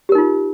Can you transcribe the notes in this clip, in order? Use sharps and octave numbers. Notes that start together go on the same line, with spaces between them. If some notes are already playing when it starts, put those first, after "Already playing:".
D#4 F4 G4 A#4